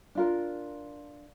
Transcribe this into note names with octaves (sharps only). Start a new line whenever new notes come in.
D4 F4 A#4